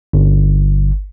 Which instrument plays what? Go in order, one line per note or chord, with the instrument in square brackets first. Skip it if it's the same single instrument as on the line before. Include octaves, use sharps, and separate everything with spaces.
[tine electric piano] G1